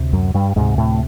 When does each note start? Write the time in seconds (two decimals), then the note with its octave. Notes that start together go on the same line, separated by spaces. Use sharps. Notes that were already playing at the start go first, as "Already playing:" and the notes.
Already playing: D2 C3
0.13 F#2 F#3
0.34 G2 G3
0.56 D2 G#2 C3 G#3
0.78 A2 A3